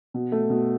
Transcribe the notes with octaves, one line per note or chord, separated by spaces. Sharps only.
B2
A3
B2